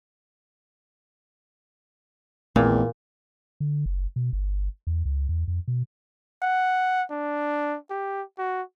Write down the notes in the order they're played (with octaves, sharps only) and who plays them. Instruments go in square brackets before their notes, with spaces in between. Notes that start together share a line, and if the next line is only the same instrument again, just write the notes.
[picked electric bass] A#1 A3 C4 [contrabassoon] E2 [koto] A#2
[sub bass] D3
F#1
B2
G1
E2
C#2
E2
F2
B2
[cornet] F#5
D4
G4
F#4